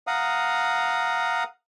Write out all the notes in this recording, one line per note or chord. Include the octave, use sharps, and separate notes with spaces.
F5 F#5 A#5 D#6